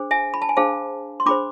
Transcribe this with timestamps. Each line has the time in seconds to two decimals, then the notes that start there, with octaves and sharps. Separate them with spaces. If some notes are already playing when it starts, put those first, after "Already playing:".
Already playing: D4 G#4 C5
0.11 E5 G#5
0.34 B5
0.42 A5
0.49 G#5
0.57 D4 G#4 C5 F5 A5
1.20 C6
1.26 D4 G#4 C5 B5 D6